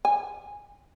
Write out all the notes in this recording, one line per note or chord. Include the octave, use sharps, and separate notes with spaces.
G#5